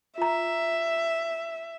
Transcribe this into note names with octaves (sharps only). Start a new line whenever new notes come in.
F4 E5 A#5